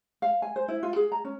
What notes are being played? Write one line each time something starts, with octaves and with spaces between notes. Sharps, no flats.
F5
G#5
C5
E4
F4
G#4
A#5
C#4